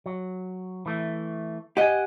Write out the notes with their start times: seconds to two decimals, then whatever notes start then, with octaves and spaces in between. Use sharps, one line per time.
0.06 F#3
0.86 E3 A3
1.77 G4 D#5 F#5 G#5